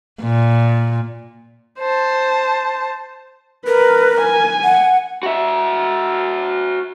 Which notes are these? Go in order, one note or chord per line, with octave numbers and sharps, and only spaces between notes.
A#2
C5 A5
A#4 B4
G#5
F#5
F#4 E5